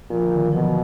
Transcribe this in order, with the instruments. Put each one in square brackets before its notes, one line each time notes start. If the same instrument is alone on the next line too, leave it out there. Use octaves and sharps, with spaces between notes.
[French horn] A#2 [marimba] F3
[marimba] D3
D#3
F#3
[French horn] B2 [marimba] F3